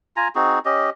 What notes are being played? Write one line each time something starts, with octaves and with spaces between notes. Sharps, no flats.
F4 G#5 A#5
C4 D#4 F#4 G#4
C#4 G4 D#5